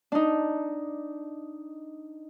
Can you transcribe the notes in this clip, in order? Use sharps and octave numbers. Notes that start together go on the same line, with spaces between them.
D4 D#4